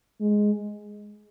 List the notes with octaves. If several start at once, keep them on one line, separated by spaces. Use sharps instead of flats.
G#3